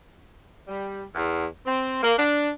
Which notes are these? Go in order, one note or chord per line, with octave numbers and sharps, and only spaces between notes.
G3
E2
C4
A#3
D4